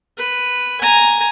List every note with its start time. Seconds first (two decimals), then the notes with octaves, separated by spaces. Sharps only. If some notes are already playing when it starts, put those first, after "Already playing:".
0.18 B4
0.81 G#5 A#5